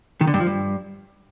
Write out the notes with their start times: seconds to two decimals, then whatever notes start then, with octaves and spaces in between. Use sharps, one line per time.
0.21 D#3
0.27 D3
0.34 G2
0.40 F3
0.46 G2